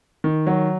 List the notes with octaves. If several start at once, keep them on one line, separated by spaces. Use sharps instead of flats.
D#3
F#3